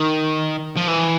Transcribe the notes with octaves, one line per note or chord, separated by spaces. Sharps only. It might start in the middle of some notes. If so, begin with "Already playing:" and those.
Already playing: D#3
F3
E3